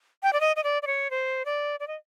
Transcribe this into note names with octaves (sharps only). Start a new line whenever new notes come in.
G5
D5
D#5
D#5
D5
D5
C#5
C5
D5
D5
D#5